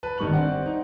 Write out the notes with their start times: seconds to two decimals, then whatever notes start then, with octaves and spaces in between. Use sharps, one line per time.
0.03 B4 A5
0.18 G1 D#3 G3 C#6 F#6 F#7
0.33 C4 D5 F#5
0.66 D#4